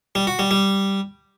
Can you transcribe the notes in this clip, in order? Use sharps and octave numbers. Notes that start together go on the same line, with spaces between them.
G3
F#4
G3
G3